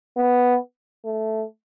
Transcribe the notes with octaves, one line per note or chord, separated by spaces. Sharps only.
B3
A3